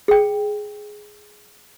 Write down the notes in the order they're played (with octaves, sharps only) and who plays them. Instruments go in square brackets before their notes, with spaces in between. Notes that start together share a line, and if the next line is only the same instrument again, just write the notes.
[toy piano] G#4 G5